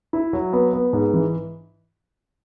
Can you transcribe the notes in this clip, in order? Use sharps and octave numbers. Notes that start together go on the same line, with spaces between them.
E4
F#3
B3
B3
G#2
E3